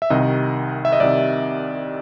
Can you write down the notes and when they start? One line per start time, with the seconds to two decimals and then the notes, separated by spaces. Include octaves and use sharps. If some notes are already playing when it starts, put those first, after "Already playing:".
0.02 E5
0.10 C2 C3 D#3 D#5
0.85 E5
0.92 D#5
1.00 C2 C3 D#3 D5